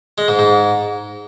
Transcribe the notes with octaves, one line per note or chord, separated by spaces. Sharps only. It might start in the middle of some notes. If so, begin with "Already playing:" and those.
G#3
G#2
G#2